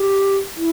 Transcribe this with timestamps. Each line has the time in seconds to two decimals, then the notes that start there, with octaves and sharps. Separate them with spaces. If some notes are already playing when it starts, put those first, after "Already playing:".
Already playing: G4
0.56 E4